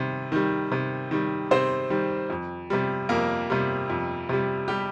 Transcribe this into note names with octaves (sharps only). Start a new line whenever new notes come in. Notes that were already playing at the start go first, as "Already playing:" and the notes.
Already playing: C3 D#3 G3
D#3 G3
C3
D#3 G3
C3 C4 C5
D#3 G3
F2
C3 G3
F2 A#3 A#4
C3 G3
F2
C3 G3
G3 G4